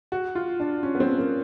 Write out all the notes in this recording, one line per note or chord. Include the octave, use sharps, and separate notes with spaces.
F#4
F4
D4
C#4
B3
C4
A#3